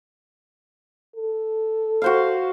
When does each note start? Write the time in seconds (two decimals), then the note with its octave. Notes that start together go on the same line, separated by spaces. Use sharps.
1.16 A4
2.02 F#4 C5 F5